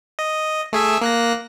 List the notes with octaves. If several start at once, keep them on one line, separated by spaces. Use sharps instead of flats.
D#5
A3 G#4 E5
A#3 F#6 A#6